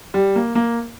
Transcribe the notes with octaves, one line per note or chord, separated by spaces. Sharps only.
G3
A#3
A#3